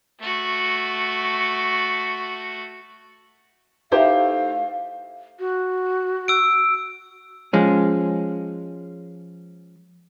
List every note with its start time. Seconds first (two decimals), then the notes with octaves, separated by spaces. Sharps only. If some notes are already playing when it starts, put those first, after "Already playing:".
0.20 A3 F#4
3.92 A3 D#4 E4 G4 C5 C#5 F5
5.40 F#4
6.28 E6 D7
7.53 F3 G#3 C#4